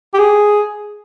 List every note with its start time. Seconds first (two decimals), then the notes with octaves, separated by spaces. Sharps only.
0.14 G4
0.19 G#4